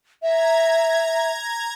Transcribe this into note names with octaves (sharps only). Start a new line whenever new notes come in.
E5 A#5 G#6